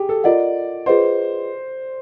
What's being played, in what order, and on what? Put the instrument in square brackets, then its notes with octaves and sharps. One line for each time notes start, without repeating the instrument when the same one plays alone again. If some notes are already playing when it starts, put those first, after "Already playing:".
Already playing: [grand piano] G4 G#4
A4
[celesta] F4 A#4 D#5 F#5 [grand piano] D5
[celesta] F4 G#4 B4 D#5 F#5 [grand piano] C5